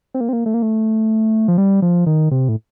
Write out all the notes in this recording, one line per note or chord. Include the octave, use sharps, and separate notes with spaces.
C4
A#3
C4
A#3
A3
A#3
A3
F3
G3
F3
D#3
C3
A2